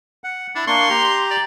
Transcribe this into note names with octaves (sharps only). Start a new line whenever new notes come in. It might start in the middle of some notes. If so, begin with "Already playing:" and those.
F#5
D4 E4
A#3 D4 C6 C#6
G4 A#5
D5